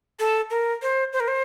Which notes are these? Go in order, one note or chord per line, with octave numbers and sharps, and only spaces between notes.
A4
A#4
C5
C5
A#4
C5